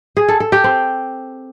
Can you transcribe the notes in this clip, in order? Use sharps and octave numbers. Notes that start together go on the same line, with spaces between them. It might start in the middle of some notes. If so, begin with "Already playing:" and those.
G#4
A4
A4
G4
C4